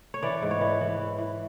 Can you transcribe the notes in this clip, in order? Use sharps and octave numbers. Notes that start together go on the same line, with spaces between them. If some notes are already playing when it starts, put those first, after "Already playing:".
C#5
E3 D5
G#2
C#5
E3
E3
E3
E3